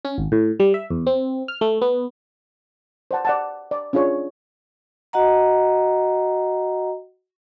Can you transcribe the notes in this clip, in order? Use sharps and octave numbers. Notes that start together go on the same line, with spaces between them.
C#4
G#1
A2
G3
E5
E2
C4
F6
A3
B3
C5 D5 F#5 A5
D5 F#5 A5
D5
C#4 D4 F4 G#4 C#5
F#4 D#5 F#5 A#5